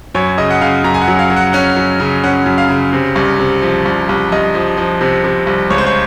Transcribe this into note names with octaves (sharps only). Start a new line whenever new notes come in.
F#2 C#5
C#3 D#5
F#5
C#3 F5
F#2 A#5
G#5
F#5
F#3
F5
F#3
F#5
C#4 F#5
F#3
C#3
C#4 F#5
F#2
F5
C#3
C3
C2
C3
F3
C2
C2
C2 D#5
F3
F3
C3
C3
C2
C#2 C#5
C5
C#5